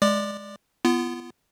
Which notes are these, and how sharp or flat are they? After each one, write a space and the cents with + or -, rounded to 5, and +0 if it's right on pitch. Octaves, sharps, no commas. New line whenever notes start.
G#3 +10 D5 +0 D6 +30
B3 +0 F4 -40